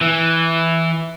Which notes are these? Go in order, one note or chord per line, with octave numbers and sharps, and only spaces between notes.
E3